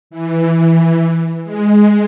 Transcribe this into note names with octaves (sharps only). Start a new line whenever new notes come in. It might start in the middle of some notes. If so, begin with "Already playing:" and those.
E3
G#3